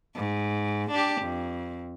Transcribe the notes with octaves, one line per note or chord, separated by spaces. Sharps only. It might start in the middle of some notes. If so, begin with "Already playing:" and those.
G#2
D4 G4
F2